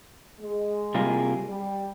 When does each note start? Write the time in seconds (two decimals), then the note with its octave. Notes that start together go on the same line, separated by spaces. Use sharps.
0.40 G#3
0.94 C3 G3 A#3 F4 G#4
1.49 G3